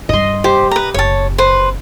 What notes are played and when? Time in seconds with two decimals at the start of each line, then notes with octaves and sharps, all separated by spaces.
0.09 G2 G3 D#5 C6
0.44 G4 C5
0.71 B4 A#5
0.94 F#1 C#5 A5
1.38 B4 C5